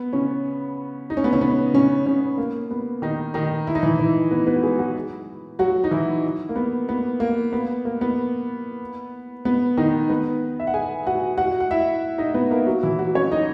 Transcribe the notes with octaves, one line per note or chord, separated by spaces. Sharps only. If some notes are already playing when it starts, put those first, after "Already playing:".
Already playing: B3
C#3 C#4
D#4
C#4
B3
C#3 C#4
B3
C#3 C#4
C#3 C#4
A#3
B3
D#3 D#4
D#3 D#4
E4
D#4
E3 E4
E3 E4
B3 B4
B3 B4
F#4
G#3 G#4
F#3 F#4
F#3 F#4
D#4
E3 E4
A#3
B3
B3
A#3
B3
A#3
B3
B3
D#3 D#4
B3 B4
E5
F#5
G#4 G#5
F#4 F#5
F#4 F#5
F#5
E4 E5
D#4 D#5
B3 B4
A#3 A#4
F#3 F#4
E3 E4
F#3 F#4
C#4 C#5
D#4 D#5